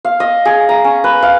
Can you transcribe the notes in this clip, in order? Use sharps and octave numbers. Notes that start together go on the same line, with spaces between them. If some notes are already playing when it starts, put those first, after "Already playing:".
F5
D#5
G#4
A#5
C#4
B4
F5